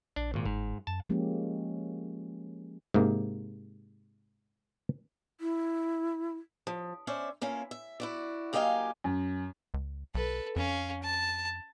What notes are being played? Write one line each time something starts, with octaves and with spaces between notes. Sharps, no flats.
A#1 D4
G#1 A#2
G1 G#2
F#2 A5
F3 G#3 A#3 C#4 G4
G#2 C3 A#3
E4
F3
C#4 C5 D5 E5
A#3 C#4 E4 F4
E5
E4 F#4 D5
F#2 A#3 G4 D#5 F5 G#5
F#2
C#2
B1 A4 B4
F2 C#4 F5
A5